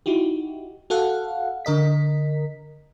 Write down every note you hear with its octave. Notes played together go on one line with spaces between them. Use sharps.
D#4 E4 F#4 G4
F#4 A4 F5 F#5
D3 A#4 D#5 B6